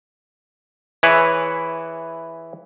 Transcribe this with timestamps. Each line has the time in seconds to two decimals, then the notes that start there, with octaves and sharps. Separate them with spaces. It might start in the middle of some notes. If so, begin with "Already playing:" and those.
1.03 E3 E4 G#4 B4 C#5